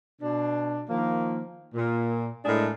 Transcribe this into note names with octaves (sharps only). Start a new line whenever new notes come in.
B2 D4
D#3 F3 A#3
A#2
A2 G#3 D4 G#4 A#4